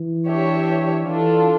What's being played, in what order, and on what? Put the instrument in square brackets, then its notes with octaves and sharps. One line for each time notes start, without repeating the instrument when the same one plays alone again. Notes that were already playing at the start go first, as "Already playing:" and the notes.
Already playing: [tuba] E3
[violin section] D4 G4 C#5 E5
[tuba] E3 [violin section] D4 F4 A4